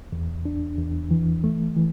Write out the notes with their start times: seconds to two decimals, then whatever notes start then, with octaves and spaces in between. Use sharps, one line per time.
0.12 E2
0.45 D4
0.78 E2
1.11 E3
1.44 A3
1.77 E3